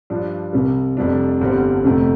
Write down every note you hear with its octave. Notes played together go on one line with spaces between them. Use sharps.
G2 F3 D4
C2 C3 G3
F1 F2 C3 G3 D4
G1 G2 D3 G3 C4
F1 F2 C3 A3